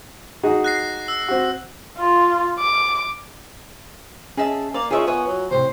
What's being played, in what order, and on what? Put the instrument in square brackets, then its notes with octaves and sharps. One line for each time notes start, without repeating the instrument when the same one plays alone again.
[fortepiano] D#4 F#4 G#4
[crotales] F#6 A#6 C7
E6
[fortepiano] C4 F#4
[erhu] F4
D6
[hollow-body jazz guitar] C#4 D#5 [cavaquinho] G#4 E5 A5
[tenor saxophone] A#3 [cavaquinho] D5
[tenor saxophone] C#3 [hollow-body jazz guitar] F4 A#4 D#5 [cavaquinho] G#4 E5 C#6
[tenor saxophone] B3 [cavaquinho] C#5 G#5 C#6
[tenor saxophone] F#3
[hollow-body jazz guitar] D#2 A2 C3 [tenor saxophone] C5